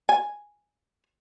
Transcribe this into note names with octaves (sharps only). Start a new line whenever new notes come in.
G#5